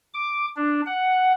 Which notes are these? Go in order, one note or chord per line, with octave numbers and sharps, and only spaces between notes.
D6
D4
F#5